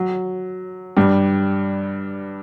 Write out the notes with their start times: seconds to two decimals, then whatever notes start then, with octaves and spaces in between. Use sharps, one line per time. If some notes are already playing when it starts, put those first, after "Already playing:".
Already playing: F#3
0.97 G2 G3